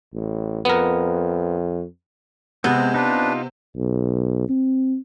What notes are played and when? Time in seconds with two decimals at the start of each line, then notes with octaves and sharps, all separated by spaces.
0.14 A1
0.65 F2 B3 A#4
2.64 C3 G#3 B3 C4
2.94 D4 D#4 F4 B4
3.76 B1
4.49 C4